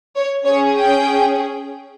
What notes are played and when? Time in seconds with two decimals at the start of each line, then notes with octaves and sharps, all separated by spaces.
0.16 C#5
0.46 C#4 G#4 C#5
0.75 G5